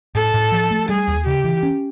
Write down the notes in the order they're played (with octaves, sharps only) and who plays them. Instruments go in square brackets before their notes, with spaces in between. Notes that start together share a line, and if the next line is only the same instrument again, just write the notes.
[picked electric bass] A2 [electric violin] A4
[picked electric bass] A2
F3
A3
[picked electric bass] G3 [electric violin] G#4
[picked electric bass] D#2
[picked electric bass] C#3 [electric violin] G4
[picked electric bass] E3
C#4